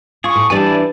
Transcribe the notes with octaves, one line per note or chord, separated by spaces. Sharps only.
F4 G#4 C#6
A2
E3 G3 D4 E4 D5 G#5